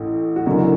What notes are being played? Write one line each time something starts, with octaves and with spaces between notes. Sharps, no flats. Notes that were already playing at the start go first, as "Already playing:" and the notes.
Already playing: A1 A2
F#4
F#1 F#2 D3 E4